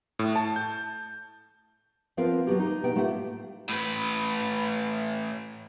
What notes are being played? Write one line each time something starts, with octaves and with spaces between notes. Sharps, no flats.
A2
A5
G6
F3 B3 C4 F4 A#4 B4
D#2 F#3 B3 D4 F#4 G4
D#4
B2 B3 G5
A2 A3 A#3 F4 G4 F#5
A2 B4